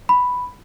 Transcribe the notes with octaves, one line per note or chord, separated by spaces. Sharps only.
B5